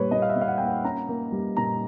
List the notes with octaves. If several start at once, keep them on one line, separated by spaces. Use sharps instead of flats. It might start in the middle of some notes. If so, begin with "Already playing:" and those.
Already playing: A#2 G3 A#3 B4 C#5
A#2 D#5
F5
E5
A#2
F5
F#5
A#3 G5
F#5
C#4 A#5
A#3
G3
A#2 A#5